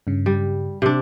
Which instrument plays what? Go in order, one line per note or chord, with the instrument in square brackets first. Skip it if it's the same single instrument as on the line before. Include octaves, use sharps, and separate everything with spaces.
[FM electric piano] G2 C#3
[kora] G3
C3 D4